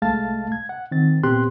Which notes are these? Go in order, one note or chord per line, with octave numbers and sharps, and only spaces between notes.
C2 G#3 A3 F5 A5 A6
G#6
F#5
D#3 C4 A6
A#2 B3 C4 G4 C6 F#6